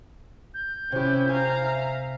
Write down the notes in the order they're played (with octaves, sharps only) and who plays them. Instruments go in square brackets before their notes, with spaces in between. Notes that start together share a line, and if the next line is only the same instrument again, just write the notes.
[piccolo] G6
[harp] C3 G4 [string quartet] C#4 E4
[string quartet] F5 A#5 [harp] G#5
[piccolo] E5